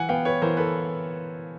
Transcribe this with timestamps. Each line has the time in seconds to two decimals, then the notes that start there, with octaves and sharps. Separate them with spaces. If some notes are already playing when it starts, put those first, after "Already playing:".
Already playing: E3 F#5 G#5
0.09 B3 F5 G5
0.25 B4 C#5
0.42 E3 A#4 C5
0.57 A4 B4